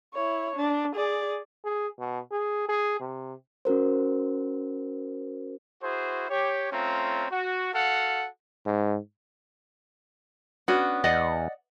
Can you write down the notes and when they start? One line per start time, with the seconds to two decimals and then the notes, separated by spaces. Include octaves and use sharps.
0.14 E4 C#5
0.56 D4
0.95 G#4 D5
1.65 G#4
1.99 B2
2.32 G#4
2.69 G#4
3.00 C3
3.65 C#4 F#4 A#4 C5
5.82 E4 F#4 G#4 C5
6.29 G4 C#5
6.71 A3 C4 C#4 F4 A#5
7.30 F#4
7.73 F#4 A4 F5 F#5
8.66 G#2
10.68 B3 C#4 D4 F#4
11.04 E2 D5 D#5 F#5